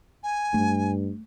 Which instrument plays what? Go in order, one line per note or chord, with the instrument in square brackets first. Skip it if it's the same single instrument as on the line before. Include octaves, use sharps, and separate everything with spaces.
[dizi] G#5
[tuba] G2 [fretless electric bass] A3